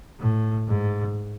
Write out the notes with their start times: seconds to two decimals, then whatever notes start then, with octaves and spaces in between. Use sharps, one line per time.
0.19 A2
0.68 G#2